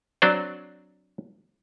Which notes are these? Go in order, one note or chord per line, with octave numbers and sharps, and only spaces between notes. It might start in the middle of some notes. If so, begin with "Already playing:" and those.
F#3 C4 D4 C5 D5